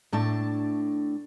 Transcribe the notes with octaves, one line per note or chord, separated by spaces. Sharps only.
A2 A3 D4 A5